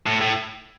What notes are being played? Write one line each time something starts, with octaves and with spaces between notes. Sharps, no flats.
A2
A2